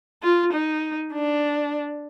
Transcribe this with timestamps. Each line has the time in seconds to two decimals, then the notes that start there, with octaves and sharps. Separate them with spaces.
0.23 F4
0.53 D#4
1.13 D4